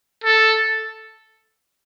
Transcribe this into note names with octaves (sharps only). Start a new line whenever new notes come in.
A4